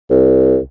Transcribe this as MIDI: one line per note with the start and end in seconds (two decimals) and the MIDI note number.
0.11 0.58 36